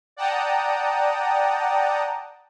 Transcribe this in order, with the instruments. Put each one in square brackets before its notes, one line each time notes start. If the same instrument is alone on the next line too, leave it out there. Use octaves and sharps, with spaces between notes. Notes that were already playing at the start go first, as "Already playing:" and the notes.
[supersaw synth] D5 F#5 G5 A5 A#5 D#6